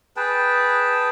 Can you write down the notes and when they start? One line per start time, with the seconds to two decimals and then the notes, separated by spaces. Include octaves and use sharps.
0.16 G#4 B4 G5 A5